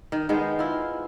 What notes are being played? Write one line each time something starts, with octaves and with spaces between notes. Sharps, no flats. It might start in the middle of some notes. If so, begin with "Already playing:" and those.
D#3
D#3 G#3 B3 C5
E4 F4